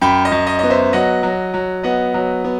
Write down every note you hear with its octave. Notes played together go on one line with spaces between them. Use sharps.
F#2 G5 B5
D#5
F#2
D#5
B3 D#5
C5 E5
F#3 D#5 F#5
F#3
F#3
B3 D#5 F#5
F#3
B3